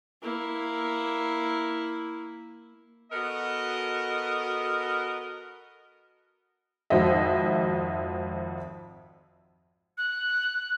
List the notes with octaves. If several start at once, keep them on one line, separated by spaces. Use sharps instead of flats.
A#3 E4
B3 F#4 A4 A#4 D#5
G#1 F2 F#4 D#5 E5
F#6